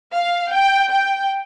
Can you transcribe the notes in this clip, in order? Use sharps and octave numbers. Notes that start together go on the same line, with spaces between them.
F5
G5
G5